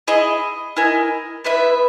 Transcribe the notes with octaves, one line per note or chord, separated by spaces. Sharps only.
E4 G#4 D#5
E4 A#4 D#5 G#5
B3 E4 B4 E5